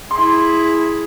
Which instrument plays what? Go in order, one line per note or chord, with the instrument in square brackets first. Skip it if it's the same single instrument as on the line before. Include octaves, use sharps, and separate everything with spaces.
[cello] E4 G#4 [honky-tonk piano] C6